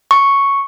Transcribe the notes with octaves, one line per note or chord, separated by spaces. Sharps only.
C#6